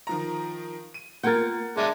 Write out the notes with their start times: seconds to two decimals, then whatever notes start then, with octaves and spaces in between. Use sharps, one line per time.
0.07 D#3 F3 A#5
0.94 D#7
1.23 A#3 F4 A#4 F#5 G5 G#6 A6
1.77 G#3 D4 E5